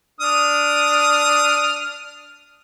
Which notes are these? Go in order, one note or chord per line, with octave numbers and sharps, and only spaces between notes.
D4 D#6 F6